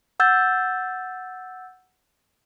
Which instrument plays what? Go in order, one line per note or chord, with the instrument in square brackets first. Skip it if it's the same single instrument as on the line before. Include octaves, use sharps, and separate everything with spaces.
[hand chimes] F#5 E6 G6 A6